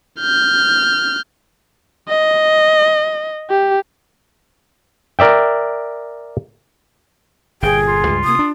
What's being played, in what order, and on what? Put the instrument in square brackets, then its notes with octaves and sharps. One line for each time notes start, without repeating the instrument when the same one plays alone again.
[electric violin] F6 G6
D#5
G4
[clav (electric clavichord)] A#4 D5 E5 G5
[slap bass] G1 A#2 [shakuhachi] G#4 [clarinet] G5
[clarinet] F4
[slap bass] C#2 G2
[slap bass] C3 A#3 [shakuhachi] D#6
[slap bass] D4